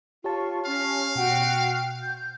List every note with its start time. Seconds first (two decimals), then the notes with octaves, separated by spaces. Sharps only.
0.24 F4 G4 C#5 A5 C#6
0.66 C#4 F5
1.16 B2 F#4 F#5 G5
2.02 G6